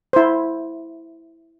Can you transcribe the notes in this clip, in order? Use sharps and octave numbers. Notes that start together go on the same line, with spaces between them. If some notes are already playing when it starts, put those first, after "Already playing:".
E4 C5